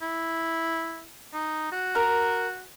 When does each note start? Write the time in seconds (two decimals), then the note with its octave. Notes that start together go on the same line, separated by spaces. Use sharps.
0.02 E4
1.34 D#4
1.72 F#4
1.95 A#4